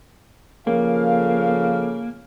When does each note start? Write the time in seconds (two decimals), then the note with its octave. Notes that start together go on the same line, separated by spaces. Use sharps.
0.67 C#3 F3 A#3 A4 F5